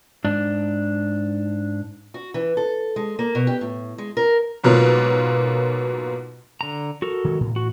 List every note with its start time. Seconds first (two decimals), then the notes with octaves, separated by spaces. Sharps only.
0.24 G#2 D4
2.14 F#4
2.34 E3
2.57 A4
2.96 G#3
3.19 A#3
3.35 B2
3.47 G4
3.61 A2
3.98 G#3
4.17 A#4
4.64 G#2 B2 F#3 A#3 F4
6.61 D3 A#5
7.02 F#4 A4 A#4
7.25 D#3 F#3 G#3
7.41 A2 E3
7.56 F#4